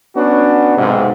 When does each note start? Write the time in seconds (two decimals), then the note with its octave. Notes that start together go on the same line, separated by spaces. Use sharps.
0.15 B3 C#4 D4 F#4
0.77 B1 G#2 C3